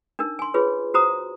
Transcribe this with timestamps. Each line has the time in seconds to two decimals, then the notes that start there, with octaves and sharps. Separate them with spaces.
0.19 D4 D#4 A#4
0.39 G#5 C6
0.54 F4 G#4 B4 C#5
0.94 F#4 C5 A#5 D#6